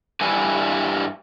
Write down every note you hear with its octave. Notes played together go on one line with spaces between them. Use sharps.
G2 G3 E4 B4 G#5